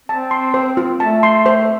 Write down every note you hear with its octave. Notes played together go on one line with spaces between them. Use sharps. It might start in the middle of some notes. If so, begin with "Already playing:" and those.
C4 A5
C6
C5
F4
A3 A5
C6
C5